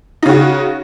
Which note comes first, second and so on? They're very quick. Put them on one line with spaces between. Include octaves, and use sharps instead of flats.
D#4 C#3 F#4